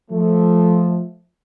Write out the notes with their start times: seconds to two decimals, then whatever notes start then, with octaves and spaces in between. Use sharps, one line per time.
0.11 F3 A3